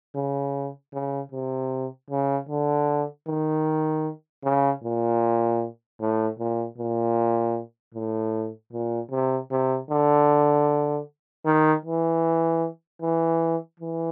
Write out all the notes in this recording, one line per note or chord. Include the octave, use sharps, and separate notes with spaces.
C#3
C#3
C3
C#3
D3
D#3
C#3
A#2
A2
A#2
A#2
A2
A#2
C3
C3
D3
D#3
E3
E3
E3